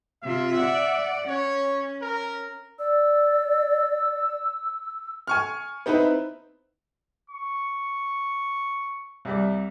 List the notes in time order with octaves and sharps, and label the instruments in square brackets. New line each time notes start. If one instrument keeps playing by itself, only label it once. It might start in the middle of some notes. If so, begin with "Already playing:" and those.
[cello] C3 F4 [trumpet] E5
[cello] D5 F#5
[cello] C#4 [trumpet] C#5
[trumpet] A#4
[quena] D5 [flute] E6
[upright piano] G#5 C#6 F6
B3 C4 D#4 E4 B4
[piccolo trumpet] C#6
[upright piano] C2 G3 D5